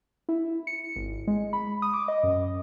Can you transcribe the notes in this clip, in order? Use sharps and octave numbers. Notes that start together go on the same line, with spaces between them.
E4
C#7
G#1
G#3
B5
D#6
D6
D#5
F#2